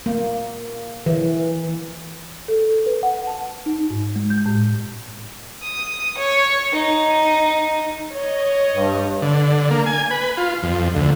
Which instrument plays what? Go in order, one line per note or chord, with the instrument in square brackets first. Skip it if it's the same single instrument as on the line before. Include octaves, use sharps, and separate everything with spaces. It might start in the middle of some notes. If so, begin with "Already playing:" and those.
[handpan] A#3
E3
[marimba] A4
B4
F#5
A5
D#4
G#2
G#3
G6
A2
[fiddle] D#6
C#5
D#4
[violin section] C#5 D#5
[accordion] G2
[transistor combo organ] D3
A#3
G#5
B4
F4
F2
D2